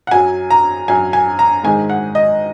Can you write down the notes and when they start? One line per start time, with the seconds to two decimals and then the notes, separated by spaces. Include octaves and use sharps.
0.07 F#5
0.11 F#2 F#3 G#5
0.50 A#5
0.88 F#2 F#3 G#5
1.13 G#5
1.39 A#5
1.64 G#2 D#3 G#3 G#5
1.89 F#5
2.15 D#5